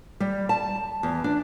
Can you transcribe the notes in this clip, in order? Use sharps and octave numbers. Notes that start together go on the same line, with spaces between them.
G3
A5
E2
D4